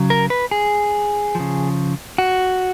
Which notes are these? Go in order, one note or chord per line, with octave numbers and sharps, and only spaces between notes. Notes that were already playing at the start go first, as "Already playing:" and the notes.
Already playing: C#3 F#3
A#4
B4
G#4
C#3 F3
F#4